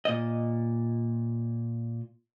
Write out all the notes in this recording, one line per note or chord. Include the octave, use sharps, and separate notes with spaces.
A#2 D#5